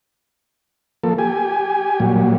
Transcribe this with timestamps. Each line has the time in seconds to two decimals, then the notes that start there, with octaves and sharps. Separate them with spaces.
1.04 F3 A#3 A4
1.18 G4 G#5
2.00 A#2 F#3 G3